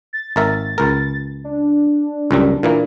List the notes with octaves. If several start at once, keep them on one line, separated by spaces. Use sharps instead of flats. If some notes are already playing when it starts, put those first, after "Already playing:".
A6
G#1 A#4 E5 A6
C#2 A#4
D4
C#2 F#2 G3
A#2 E3 A#3